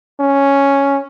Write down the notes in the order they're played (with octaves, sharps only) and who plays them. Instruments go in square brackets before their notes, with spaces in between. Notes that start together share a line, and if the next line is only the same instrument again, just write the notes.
[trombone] C#4